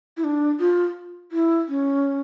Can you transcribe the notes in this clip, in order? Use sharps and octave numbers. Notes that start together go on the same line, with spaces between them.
E4
D4
F4
E4
C#4